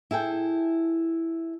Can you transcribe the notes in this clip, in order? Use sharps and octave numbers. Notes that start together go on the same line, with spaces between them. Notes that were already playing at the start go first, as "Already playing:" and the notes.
E4 G#4 A4 G5